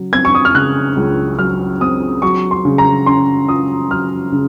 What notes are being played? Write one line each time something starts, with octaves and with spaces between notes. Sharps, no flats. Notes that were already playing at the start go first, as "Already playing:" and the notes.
Already playing: C#3 F#3
C4 G#6
C#6
D#6
F6
C#3 F#6
C#2
F#3 F6
C4 D#6
F#3 C#6
C6
C#3
A#5
C#4 C6
F4 D#6
F#3 F6
C#3